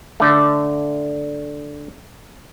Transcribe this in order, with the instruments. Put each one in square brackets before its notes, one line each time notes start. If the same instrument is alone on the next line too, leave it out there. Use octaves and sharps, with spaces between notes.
[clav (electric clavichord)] D3 A3